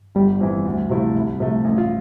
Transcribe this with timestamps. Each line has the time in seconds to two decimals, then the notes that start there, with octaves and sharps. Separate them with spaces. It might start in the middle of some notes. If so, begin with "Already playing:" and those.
0.15 G1 G3
0.41 F2 E3
0.65 D2
0.90 C3 F3 A3 E4
1.15 C2
1.40 C3 F3 A3
1.65 A1
1.78 F4